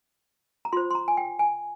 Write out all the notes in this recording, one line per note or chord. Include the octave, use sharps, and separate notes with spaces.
A#5
F4 C5 C6
C6
A#5
G#5
G5
G#5